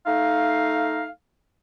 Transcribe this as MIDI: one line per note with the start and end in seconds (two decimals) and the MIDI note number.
0.07 1.07 57
0.07 1.07 63
0.07 1.07 77